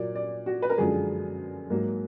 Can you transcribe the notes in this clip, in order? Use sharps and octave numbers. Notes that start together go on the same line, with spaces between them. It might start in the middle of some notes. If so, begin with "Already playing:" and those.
Already playing: A#2 F#3 A#3 D5
D5
F#4
B4
A#4
F#2 D3 F3 G#3 G#4
G#2 F#3 A#3